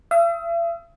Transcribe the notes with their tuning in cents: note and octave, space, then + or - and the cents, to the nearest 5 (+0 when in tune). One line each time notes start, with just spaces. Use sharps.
E5 +45 D#6 +40